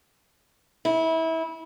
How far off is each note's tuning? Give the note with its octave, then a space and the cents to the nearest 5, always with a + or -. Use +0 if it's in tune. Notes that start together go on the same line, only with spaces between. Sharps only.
E4 -25